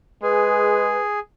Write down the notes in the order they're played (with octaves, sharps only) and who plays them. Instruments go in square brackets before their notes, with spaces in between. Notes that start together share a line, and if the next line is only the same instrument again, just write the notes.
[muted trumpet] G#3 [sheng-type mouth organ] G#4 [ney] B4